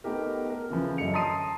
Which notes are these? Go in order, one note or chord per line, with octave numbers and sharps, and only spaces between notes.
A3 B3 D#4 G4 A#4
A#4
C#3 E3 F3
F#2 D3 D#5 C#7 F7
A5 A#5 C6 D#6 C7 D#7